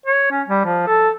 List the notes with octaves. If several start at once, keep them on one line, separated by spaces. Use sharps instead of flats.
C#5
C#4
G3
F3
A4